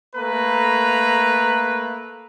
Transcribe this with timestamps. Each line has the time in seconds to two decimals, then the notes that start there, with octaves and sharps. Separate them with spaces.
0.16 A3 A#3 B4 A#5